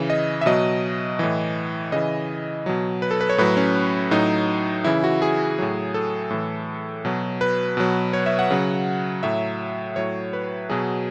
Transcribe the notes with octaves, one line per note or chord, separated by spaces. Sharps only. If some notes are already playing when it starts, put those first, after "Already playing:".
Already playing: C#3 E3
D#5
E5
B2 F#3 D#5
A2 E3
C#3 E3 D#5
B2 F#3
B4
A4
B4
C#5
A2 F#3 B4
C#4
A2 F#3 D#4
C#3 E3 E4
F#4
G#4
A2 F#3
A4
A2 E3
B2 F#3
B4
B2 F#3
C#5
E5
F#5
C#3 F#3
A2 F#3 E5
A2 F#3 C#5
B4
B2 F#3 G#4